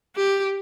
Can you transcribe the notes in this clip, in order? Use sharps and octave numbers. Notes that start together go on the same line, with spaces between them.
G4